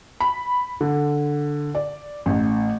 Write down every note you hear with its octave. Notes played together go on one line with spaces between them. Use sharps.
B5
D3
D5
A1